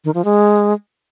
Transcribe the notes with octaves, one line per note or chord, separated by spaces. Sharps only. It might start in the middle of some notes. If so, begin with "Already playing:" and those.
D#3
F3
G#3